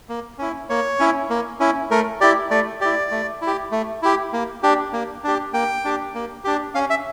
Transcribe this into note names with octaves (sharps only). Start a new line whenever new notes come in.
A#3
C#4 E4
A#3 C#5
C#4 E4
A#3
C#4 E4
A3 A#4
E4 G4 D5
A3 D5
E4 G4 D5
A3
E4
G4
A3
E4 G4
A#3
D4 G4
A#3
D4 G4
A#3 G5
D4 G4
A#3
D4 G4
C#4 F5
E5